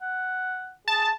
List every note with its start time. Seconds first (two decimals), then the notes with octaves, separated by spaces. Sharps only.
0.02 F#5
0.88 G#4 A5